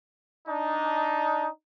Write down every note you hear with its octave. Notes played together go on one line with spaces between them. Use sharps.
D4 D#4